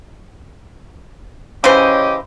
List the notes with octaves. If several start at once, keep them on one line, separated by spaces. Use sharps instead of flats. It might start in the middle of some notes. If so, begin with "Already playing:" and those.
C#3 E3 C#4 G4 C5 D#5